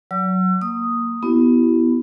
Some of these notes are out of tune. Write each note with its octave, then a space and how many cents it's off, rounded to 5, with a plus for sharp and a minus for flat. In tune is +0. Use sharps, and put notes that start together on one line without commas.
F#3 +0 D5 -40 E6 +40
A#3 +0 D#6 +0
B3 +5 E4 +0 G4 -35